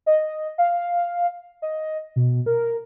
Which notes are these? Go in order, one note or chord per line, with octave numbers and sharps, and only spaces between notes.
D#5
F5
D#5
B2
A#4